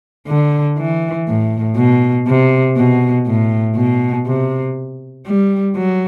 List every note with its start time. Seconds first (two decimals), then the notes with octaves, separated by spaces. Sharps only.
0.28 D3
0.78 E3
1.28 A2
1.77 B2
2.27 C3
2.77 B2
3.26 A2
3.76 B2
4.27 C3
5.26 G3
5.75 F#3